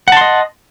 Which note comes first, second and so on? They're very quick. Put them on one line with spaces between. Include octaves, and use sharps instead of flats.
F#5 A5 C6 D#5